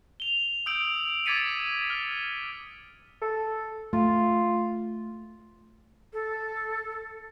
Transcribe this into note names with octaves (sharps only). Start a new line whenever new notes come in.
F7 G7
D#6 E6 G6 D7 F#7
D6 G#6 A6 B6 C#7 D#7
F6
A4
A3 F4
A4